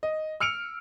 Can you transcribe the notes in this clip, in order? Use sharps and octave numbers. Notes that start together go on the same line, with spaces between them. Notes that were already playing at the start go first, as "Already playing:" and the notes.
D#5
E6 F6 C#7 D7 F7